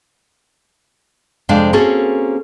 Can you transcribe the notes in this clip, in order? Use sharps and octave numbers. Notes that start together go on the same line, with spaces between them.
F2 C3 G#3 D4 C5 F5
A#3 C4 C#4 F#4 G#4 A4